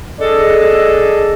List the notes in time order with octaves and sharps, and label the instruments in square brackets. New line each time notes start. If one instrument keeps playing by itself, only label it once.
[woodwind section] D4 G#4 A4 D#5